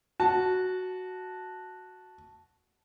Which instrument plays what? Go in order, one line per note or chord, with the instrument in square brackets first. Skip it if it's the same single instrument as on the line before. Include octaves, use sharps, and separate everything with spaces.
[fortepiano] F#4 [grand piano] A5